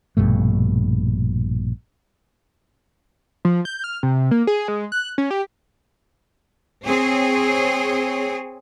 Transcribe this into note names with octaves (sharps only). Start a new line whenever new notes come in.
A#1 G2 B2 A3
F3
G6
F6
C3
A#3
G#4
G#3
F#6
C#4
G4
C4 G#4 C#5